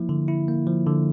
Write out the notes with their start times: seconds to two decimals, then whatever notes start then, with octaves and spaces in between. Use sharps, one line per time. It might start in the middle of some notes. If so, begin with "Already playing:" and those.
Already playing: F3 A#3 E4
0.09 D3
0.28 E4
0.48 A#3
0.67 F3
0.87 D3